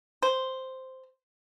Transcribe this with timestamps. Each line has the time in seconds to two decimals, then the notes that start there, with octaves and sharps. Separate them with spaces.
0.23 C5